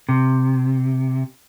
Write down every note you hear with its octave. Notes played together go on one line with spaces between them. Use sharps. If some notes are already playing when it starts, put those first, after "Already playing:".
C3